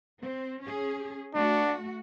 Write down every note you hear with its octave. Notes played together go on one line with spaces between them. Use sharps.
C4
C#4 G#4
A3 D4 F#4